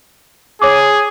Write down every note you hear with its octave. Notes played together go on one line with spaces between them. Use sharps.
G#4 C#5 D6